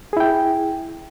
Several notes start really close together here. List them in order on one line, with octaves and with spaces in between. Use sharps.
G#4 E4 G5